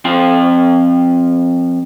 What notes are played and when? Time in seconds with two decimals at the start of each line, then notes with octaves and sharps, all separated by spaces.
0.05 F3 C4 G5 C6